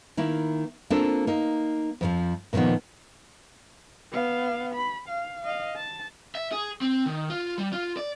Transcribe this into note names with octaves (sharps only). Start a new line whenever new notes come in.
D#3 A#3 E4
A#3 C4 D4 F4 A4
A#3 D#4
F2 D#3 F3
A#2 D3 D#3 F3 B3
B3 F5
B5
F5
D#5 F5
A5
E5
G#4
C4
D#3
F4
G3
F4
D5